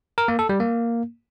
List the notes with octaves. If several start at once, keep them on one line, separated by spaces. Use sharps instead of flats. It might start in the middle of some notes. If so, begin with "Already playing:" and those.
A#4
A#3
A4
G3
A#3